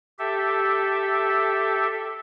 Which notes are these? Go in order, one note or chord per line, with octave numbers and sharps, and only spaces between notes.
G4 A4 E5